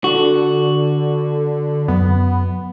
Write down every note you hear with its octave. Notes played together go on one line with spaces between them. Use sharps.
D3 F#4
F#2 B3